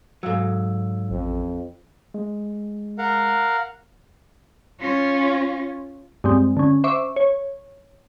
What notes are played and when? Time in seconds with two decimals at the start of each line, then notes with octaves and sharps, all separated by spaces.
0.23 G#2 F#3 A4 F5 E6
1.10 A1 F2
2.14 G#3
2.98 A#4 F5 F#5
4.81 C#4 F4
6.24 G2 G#3 C4
6.57 D3 C#4
6.84 C5 E5 C#6 D6
7.16 C#5